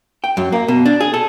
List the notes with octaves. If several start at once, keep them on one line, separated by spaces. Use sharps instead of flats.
G5
F#2
A#3
B2
D4
G#4
A4